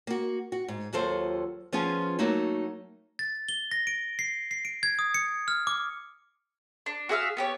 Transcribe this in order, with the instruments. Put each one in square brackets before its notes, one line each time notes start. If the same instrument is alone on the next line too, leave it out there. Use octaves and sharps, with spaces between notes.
[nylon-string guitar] A#3 F#4
F#4
G#2
D#2 F#3 F4 A4 C5
F3 B3 C#4 F4 G#4
F#3 A3 A#3 D#4 F#4
[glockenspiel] A6
G7
A#6
D7
C7
C7
D7
G#6
D#6
C#7
F6
D6
[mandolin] D4
F#4 G#4 E5 F5
B3 G4 C#5